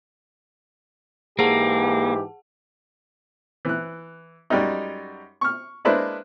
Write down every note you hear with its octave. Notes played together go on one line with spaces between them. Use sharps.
G#2 E3 A#3 G4 G#4 F#5 A5
E3 F#6
F#2 G3 G#3 D#4
C#6 F6
G#3 A#3 D4 E4 B4 C5